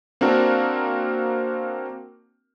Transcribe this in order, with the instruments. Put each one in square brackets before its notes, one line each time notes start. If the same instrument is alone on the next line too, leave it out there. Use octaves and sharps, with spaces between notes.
[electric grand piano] A#3 C4 D4 F#4 A#4